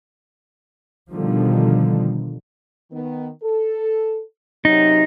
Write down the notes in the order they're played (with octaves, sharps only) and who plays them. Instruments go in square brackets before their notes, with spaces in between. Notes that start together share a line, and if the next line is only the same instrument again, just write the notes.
[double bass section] B2 D3 D#3 F3 G3
[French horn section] D#3 B3
A4
[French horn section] F#2 C3 F#3 [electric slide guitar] D#4